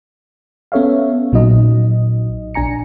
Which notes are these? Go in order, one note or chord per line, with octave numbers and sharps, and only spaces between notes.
B3 C#4 A4 C#5 E5 F5
A#1 A#2 F#3 D#4 D#5
A#1 D4 G#5 A#5 C#7